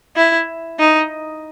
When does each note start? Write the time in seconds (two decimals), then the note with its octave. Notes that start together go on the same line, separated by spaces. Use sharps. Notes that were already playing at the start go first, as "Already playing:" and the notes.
0.16 E4
0.79 D#4